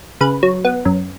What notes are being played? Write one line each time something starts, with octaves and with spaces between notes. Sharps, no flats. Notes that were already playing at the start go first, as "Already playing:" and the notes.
C#3 B4
F#3
B3
F#2